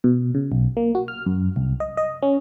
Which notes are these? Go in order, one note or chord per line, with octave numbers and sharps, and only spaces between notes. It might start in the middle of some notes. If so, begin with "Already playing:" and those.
B2
C#3
B1
A#3
F#4
F6
F#2
C2
D#5
D#5
C#4